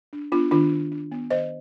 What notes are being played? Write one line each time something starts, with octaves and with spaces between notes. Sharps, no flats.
D4
B3 D4 F4
D#3 D4 F4
D#3
D4
B3
D#3 C5 D#5